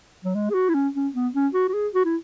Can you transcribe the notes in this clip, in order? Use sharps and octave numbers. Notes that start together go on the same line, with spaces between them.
F#3
G#3
G#4
F#4
E4
C#4
C#4
B3
C#4
F#4
F#4
G#4
F#4
E4